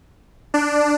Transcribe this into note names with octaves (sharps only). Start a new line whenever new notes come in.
D4